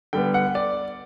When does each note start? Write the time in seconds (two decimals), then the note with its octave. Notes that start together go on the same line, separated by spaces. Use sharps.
0.13 D3 G3 B3 G5
0.34 F#5
0.55 D5